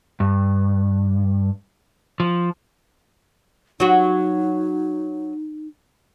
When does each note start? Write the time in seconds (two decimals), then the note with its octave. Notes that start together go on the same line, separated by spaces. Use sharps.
0.20 G2
2.20 F3
3.80 F#3 D#4 F#4